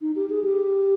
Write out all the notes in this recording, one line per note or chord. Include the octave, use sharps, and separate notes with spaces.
D#4
G4
G#4
G4